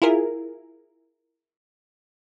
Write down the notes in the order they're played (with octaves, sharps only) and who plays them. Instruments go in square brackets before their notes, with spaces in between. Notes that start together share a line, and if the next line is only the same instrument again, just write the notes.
[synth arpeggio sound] E4 F4 G#4 A#4